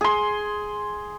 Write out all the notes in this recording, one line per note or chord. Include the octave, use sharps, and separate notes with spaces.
G#4 C6